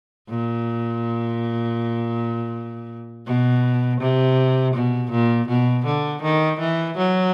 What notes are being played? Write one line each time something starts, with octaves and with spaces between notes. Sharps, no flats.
A#2
B2
C3
B2
A#2
B2
D3
D#3
E3
F#3